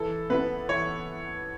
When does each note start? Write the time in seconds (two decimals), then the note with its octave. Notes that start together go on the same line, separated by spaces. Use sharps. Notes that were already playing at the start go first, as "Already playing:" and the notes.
Already playing: E3 A4
0.30 B3 E4 B4
0.68 E3 C#5